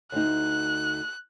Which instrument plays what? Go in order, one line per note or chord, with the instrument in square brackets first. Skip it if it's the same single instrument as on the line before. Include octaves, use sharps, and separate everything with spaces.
[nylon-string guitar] D2 D#4 [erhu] F#6